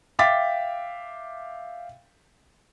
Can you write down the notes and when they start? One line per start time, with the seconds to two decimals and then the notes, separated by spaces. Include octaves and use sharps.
0.19 E5 F5 G5 D6 A6 B6